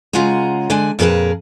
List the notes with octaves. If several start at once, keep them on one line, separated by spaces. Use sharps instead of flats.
C#3 G#3 F4 F#5 G#5 A#5
D3 G#3 D4 D5 G#5
F2 A#2 G#4 A#4 B4 A5